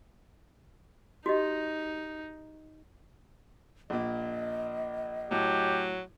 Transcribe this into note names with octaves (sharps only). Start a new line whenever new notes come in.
D#4 F#4 G4 D#5
A#1 A#2 D#5
A2 F#3 G4